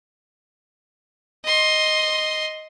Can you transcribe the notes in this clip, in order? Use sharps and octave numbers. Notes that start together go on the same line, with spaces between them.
D#5 C6